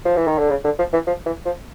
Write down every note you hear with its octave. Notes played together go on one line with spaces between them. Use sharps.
F3
E3
D#3
D3
C#3
D3
F3
E3
F3
E3
F3